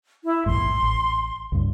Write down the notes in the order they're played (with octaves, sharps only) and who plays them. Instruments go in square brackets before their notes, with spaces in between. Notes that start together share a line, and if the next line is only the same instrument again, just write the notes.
[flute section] E4
[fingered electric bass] A#1 E2 G#2 [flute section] C6
[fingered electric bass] A1
C#2 G2